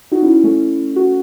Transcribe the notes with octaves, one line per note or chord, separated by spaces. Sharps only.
D#4 F#4
C#4 E4
A3 C#4
F#4